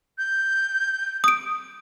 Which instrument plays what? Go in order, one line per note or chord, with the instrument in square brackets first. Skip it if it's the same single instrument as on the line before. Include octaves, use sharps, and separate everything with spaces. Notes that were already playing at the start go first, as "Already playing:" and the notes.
[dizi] G6
[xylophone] D#6 D7